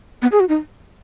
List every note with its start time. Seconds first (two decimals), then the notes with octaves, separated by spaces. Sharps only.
0.22 B3
0.32 G#4
0.40 F#4
0.49 D#4